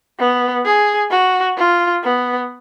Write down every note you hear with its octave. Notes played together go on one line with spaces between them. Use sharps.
B3
G#4
F#4
F4
B3